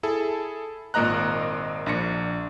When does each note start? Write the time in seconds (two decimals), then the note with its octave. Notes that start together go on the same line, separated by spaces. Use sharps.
0.03 E4 G#4 A4
0.94 G#1 A#2 A#3 D#5 A#5 F#6
1.86 A#1 D4 A#6 C#7